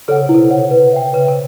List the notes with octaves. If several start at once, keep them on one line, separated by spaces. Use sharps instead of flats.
C#3 A4 C#5 F#5
C3
B2 E4
C3
A4 C#5 F#5
B4
E5 G5
C#3 B4
C3